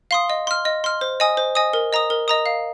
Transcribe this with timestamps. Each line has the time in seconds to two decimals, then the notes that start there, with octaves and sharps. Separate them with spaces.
0.11 F5 C6 D#6
0.30 D#5
0.47 C6 F6
0.65 D#5
0.84 C6 F6
1.01 C5
1.20 D#5 G#5 D#6
1.37 C5
1.55 D#5 G#5 D#6
1.73 A#4
1.93 D#5 A#5 D#6
2.10 A#4
2.28 D#5 A#5 D#6
2.46 F5